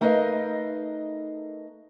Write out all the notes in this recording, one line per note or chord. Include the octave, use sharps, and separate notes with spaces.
A3 D#4 A#4 B4 D#5 F5